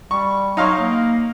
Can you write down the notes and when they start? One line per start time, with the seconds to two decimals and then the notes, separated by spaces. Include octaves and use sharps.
0.11 G3 C#6
0.57 F#3 D#4 F5 C6
0.79 A#3